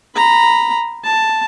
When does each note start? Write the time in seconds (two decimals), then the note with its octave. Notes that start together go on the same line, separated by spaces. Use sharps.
0.15 A#5 B5
1.05 A5